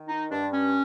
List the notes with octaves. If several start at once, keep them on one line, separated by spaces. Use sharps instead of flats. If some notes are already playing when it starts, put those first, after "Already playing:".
Already playing: D#3
D#4
G2 D4
C#4